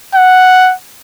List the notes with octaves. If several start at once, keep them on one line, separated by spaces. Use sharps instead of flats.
F#5